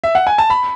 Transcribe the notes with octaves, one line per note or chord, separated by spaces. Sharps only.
E5
F#5
G#5
A5
B5